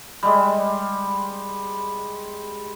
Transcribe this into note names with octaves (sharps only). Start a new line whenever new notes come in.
G3 G#3